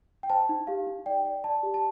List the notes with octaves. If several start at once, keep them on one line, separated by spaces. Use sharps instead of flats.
G5
C5 A5
D#4
G4 F5
D#4
D5 G5
D5
D5 A5
G4
A5